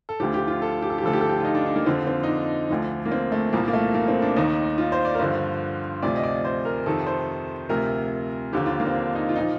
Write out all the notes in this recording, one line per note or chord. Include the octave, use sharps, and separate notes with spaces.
A4
D2 D3 F3 G4
G4
F4
A4
G4
A4
G4
D2 D3 F3 A4
G4
A4
G4
F4
D#4
D4
D4
A#3
F2 D3 F3 C4
C4
D#4
D4
D2 D3 F3
A#3
C4
A3
C2 A#2 F3 A#3
A#3
A3
A#3
C4
D4
D#2 D#3 D#4
F4
C5
D5
A#4
G2 D3 F3 C5
D2 C3 F3 D5
D#5
D5
C5
A#4
F2 C3 D#3 A4
C5
D2 C3 F3 A#4
D#2 D3 F3 G4
F4
A#3
C4
D4
D#4
F4
A#2 F3 D#4